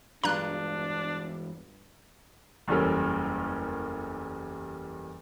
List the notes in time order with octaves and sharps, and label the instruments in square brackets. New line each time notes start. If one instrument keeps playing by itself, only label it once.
[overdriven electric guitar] E2 G#3 [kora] G2 F4 [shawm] D4 [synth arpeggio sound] A#5 F#6
[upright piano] F#1 E2 G3 C#4 A4 A#4